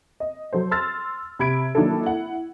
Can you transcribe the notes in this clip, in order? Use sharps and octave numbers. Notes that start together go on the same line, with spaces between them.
D#5
F#3 A4 C5
C6 E6 F6 A6
C3 B5 G#6 D7
D#3 F#3 A#3 D4 E4 A4
E4 F#5